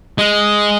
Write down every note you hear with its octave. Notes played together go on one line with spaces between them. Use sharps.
G#3